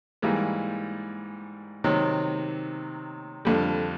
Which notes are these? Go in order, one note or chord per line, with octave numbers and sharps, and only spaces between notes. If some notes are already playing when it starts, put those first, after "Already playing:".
G#2 E3 G3 A#3
C3 D#3 F#3
F2 D3 G3